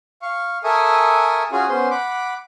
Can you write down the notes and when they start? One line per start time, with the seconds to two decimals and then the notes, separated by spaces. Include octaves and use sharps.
0.22 F5 C#6
0.64 A4 A#4 E5 G#5 C#6 D#6
1.52 C#4 F4 F#4 G#4 G#5
1.69 B3 C#4 C5 C6
1.91 F#5 B5 D6